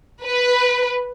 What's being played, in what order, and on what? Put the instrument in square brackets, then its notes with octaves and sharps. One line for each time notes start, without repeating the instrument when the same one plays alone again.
[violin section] B4